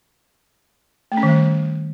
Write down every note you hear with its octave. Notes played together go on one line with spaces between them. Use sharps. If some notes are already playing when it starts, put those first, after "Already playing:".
A3
C#4
D#3
G3